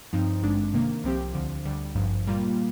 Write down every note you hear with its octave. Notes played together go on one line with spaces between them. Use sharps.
G2 F3 C4 D#4
G#1 G2 D3 G#3 D4
C3 D#3 A#3
C2 C3 F3 C4 G4
D2 D3 F3
D2 D3 G3
G#1 G2 F3
A#2 G3 A#3 F4